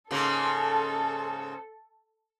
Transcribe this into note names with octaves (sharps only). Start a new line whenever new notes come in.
G#2 C#3 A#3 A4